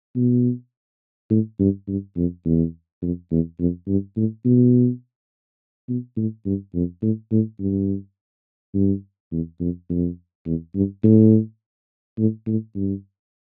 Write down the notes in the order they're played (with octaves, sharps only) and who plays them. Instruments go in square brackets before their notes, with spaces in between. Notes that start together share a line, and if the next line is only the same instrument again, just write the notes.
[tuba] B2
A2
G2
G2
F2
E2
F2
E2
F2
G2
A2
B2
B2
A2
G2
F2
A2
A2
G2
G2
E2
F2
F2
E2
G2
A2
A2
A2
G2